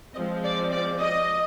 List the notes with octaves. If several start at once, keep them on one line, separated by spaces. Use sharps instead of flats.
F3 G#3 C4 D#5
D5
D5
D#5